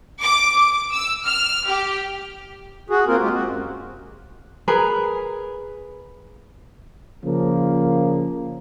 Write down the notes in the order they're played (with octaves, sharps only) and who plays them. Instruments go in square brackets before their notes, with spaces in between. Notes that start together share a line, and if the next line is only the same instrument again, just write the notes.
[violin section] D6
D6
E6
F6
G4
[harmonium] F#4 G#4
A#3 C4 F4 A#4
G#3 F4 G4
C4 F#4
F#2
[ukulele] G#4 A#4 B4
[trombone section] C#3 F3 A#3